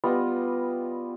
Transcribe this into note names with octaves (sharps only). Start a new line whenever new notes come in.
G3 B3 F4 D#5